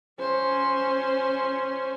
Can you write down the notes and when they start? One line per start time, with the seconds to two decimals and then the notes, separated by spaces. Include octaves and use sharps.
0.20 C#4 C5